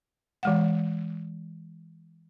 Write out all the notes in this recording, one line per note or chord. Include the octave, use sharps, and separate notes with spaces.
E3 G#3 F#5